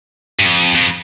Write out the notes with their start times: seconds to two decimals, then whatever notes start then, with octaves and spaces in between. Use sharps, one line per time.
0.39 G2
0.46 F2
0.75 F2